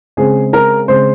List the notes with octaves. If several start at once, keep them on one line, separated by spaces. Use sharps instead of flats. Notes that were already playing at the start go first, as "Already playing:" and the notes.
C#3 G#3 C4 G#4
A#4
C#3 G#3 C4 C5